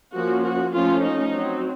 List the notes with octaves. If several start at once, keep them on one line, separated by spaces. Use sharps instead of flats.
F3 A#3 C#4 F#4
F#4
F3 A3 C#4 F4
D#4
F#3 C4